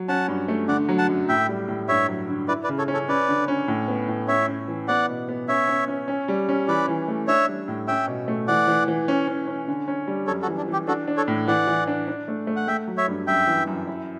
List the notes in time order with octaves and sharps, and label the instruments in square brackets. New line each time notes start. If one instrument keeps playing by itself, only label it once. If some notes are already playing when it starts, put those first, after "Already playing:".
Already playing: [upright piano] F#3
[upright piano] C#4 [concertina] F#5 A5
[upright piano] G2
A3
[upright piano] D3 [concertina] D5 F#5
[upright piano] F#3
[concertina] F#5 A5
[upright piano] F#2
[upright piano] A2 [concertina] E5 G5
[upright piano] G3
A2
[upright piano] G2 [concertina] C#5 E5
[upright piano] F#3
D3
[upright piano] E4 [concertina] B4 D5
[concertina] B4 D5
[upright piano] C#3
[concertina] A4 C#5
[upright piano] C#4
[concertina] A4 C#5
[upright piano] C#4 [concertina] B4 D5
[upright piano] D3
C#4
A2
B3
A2
[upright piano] C#4 [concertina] C#5 E5
[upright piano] C#4
E3
[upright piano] B3 [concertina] D5 F#5
[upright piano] B2
B3
[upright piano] C#4 [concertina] C#5 E5
[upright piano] C#4
C#4
C#4
G3
C#4
[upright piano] E3 [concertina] B4 D5
[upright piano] E3
A3
[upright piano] D4 [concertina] C#5 E5
[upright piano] G3
A2
[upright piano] C#4 [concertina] E5 G5
[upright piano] B2
A3
[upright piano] E3 [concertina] D5 F#5
[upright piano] E3
E3
C#4
C#4
C#4
D3
C#4
G3
[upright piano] F#2 [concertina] A4 C#5
[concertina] F#4 A4
[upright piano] E3
[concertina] D4
[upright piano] E3 [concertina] G4
[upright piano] D4 [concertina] F#4 A4
[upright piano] D4
[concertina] A4 C#5
[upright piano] A2
[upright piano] E3 [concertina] D5 F#5
[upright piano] E3
D4
D4
A3
A3
[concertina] F#5
[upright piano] A3 [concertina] E5 G5
[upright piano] F#3
[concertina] C#5 E5
[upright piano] G2
[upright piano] F#2 [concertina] E5 G5
[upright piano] E3
F#2
E4